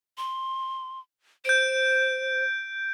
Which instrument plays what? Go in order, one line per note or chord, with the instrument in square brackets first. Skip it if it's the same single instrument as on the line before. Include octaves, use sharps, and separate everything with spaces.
[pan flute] C6
[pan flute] C5 [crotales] G6 D7